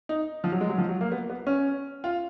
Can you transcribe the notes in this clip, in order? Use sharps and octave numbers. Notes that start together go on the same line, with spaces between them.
D#4
F3
F#3
G#3
F#3
F3
F#3
A#3
B3
B3
C#4
F4